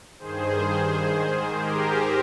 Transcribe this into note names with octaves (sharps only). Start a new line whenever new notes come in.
G2 D#3 G#4 C5
G#2 D#3
G4 A#4